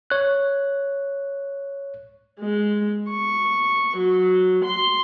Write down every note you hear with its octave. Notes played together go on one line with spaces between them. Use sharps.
C#5 F#6
G#3
C#6
F#3
C6